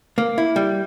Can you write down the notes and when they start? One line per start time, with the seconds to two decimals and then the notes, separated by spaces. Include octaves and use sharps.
0.18 A#3
0.38 E4
0.56 G3